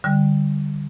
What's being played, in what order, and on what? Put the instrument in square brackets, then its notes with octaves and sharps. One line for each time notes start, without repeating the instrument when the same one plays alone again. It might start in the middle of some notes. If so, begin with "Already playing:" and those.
[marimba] D3 G3